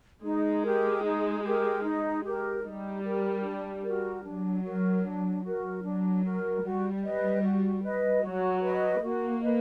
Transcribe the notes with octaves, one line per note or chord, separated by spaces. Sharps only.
G#3 D#4
G4 A#4
D#4
G4 A#4
D#4
G4 A#4
G3 D#4
G4 A#4
D4
F#4 A#4
F#3 D4
F#4 A#4
D4
F#4 A#4
F#3 D4
F#4 A#4
G3 F#4
B4 D#5
F#4
B4 D#5
F#3 F#4
B4 D#5
A#3 F#4
B4 D#5